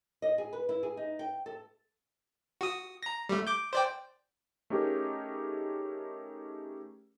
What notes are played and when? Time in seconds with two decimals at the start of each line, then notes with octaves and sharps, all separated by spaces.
0.22 D#5
0.38 G#4
0.53 B4
0.69 E4
0.83 G#4
0.97 D#4
1.19 G5
1.46 A4
2.61 F#4 D#6
3.03 A#5 A#6
3.29 G3 A3
3.47 D6 G6
3.73 C5 D5 G5
4.70 A3 C#4 D#4 G4 G#4 A#4